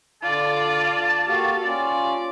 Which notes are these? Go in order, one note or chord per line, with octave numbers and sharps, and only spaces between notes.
D3 F4 D5 A5
A#3 F#4 G4 A4 F5
C#4 F4 D5